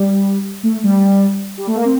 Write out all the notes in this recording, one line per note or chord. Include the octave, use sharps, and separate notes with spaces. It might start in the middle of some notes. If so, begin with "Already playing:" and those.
Already playing: G3
A3
G3
G3
A3
A#3
C4